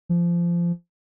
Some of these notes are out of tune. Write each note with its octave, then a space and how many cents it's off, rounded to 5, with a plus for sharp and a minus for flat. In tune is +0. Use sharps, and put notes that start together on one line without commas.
F3 -20